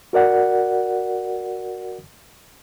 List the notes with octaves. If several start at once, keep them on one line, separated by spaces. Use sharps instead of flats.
F#4 A#4 D5 F#5